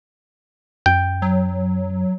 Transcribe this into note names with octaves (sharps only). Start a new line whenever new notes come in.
F#2 G5
F#3